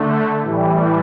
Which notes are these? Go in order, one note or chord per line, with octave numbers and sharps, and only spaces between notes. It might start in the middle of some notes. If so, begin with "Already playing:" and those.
Already playing: D3 A3
A2 E3 G3